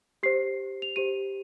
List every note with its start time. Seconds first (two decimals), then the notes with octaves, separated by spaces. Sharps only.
0.23 G4 C5 C7
0.82 F7
0.96 G4 C5 D#7